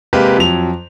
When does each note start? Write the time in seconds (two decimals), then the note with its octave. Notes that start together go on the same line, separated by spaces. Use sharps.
0.13 C3 G#3 A#3 G4 A#4 B4
0.37 F2 F#3 F7